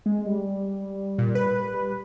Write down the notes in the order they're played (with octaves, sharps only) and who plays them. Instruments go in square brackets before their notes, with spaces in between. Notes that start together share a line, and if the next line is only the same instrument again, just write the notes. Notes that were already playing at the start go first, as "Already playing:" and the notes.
[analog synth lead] G#3
G3
[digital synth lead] A#2
B4
[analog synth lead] G3